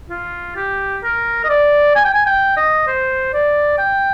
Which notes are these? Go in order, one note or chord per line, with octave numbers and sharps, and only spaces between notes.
F4
G4
A#4
D#5
D5
G#5
G5
G#5
G5
D#5
C5
D5
G5